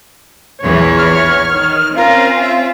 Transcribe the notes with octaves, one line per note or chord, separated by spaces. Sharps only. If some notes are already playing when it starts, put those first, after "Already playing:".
A#1 E2 E3 C#5
F6
D#3
C4 C#4 F4 A#4
E5